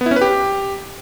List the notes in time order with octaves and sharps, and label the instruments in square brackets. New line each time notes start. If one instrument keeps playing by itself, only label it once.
[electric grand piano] B3
E4
C#4
B4
G4